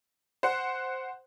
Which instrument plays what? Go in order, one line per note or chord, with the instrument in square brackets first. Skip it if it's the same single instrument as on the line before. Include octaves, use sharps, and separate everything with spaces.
[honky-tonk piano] C5 F#5